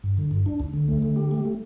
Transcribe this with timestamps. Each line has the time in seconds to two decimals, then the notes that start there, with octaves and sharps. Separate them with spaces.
0.04 G2
0.18 D3
0.31 G2
0.46 D4
0.60 D2
0.73 D3
0.88 A3
1.03 D3
1.16 G4
1.31 A3
1.45 A3